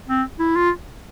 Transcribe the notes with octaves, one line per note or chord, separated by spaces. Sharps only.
C4
E4
F4